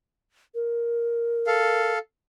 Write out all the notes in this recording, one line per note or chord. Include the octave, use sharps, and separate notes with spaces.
A#4
A4 F5